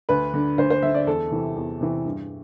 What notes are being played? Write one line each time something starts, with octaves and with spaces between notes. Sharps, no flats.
D2 B4
D3
D2 C5
C5
D3 E5
D5
E2 A4
C3 E3
E2
C3 E3
G2